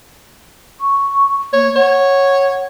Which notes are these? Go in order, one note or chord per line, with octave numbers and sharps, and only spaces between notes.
C#6
A#3 C#5
C#5 F#5